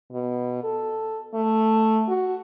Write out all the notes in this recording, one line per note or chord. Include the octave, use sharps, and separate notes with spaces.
B2
A4
A3
F#4